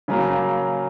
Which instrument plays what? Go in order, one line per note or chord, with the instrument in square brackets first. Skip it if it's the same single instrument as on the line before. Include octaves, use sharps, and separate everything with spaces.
[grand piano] C#3 F#3 A#3